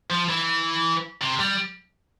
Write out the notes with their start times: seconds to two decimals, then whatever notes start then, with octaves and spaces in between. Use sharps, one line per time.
0.10 F3
0.29 E3
1.21 C3
1.39 G3